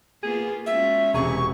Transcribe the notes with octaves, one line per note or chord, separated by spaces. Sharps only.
A#3 B3 F4 G#4
G#3 C#4 F4 F#4 E5
E1 C3 G#4 C#6